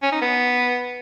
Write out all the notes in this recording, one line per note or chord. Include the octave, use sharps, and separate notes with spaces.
C#4
D#4
B3